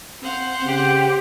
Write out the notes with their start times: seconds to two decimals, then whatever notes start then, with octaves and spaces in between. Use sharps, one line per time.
0.23 C4 C5 F5 F#5
0.65 C#3 G4